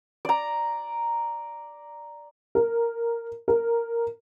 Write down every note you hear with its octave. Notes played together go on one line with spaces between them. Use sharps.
D5 A#5
A#4
A#4